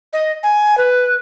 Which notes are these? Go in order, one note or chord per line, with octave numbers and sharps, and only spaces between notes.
D#5
G#5
B4